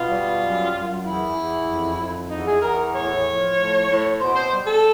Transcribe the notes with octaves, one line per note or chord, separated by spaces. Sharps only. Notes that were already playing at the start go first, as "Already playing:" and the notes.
Already playing: B2 F4
G3
F#2
F#2
E2 E4
E2
F2
F2
E2 D#4
G#4
E2 A#4
A2 C#5
F3
A2
A2
B2 C5
C5
G3
A4